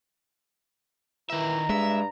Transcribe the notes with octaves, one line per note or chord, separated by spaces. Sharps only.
D#3 E3 E5 A#5
G2 G#3 E5